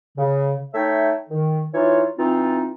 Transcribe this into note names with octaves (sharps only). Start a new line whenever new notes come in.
C#3
A3 D#4 C#5 E5 G5
D#3
E3 D#4 F4 C#5
E3 C4 D#4 F4